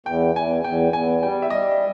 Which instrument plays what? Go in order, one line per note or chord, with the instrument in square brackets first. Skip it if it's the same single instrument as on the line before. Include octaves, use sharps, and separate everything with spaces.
[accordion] E2 [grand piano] G5
[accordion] E2 [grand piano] G#5
[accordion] E2 [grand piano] G5
[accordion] E2 [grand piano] G#5
[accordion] G3 [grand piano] G5
[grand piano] E5
[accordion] G3 [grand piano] D#5